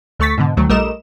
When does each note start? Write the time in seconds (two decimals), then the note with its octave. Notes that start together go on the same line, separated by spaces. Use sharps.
0.19 D2 A3 C#6 A6 B6
0.38 G#2 B2 D3
0.57 D2 D#3 F#3 A3
0.69 A#1 G3 A3 A#4 D#5 E7